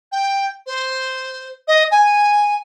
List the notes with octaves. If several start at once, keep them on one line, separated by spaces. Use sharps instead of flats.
G5
C5
D#5
G#5